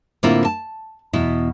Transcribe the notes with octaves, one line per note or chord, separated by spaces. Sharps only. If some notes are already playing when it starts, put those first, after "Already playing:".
A2 D3 A#3 C4 E4 F4
A5
E2 B2 E4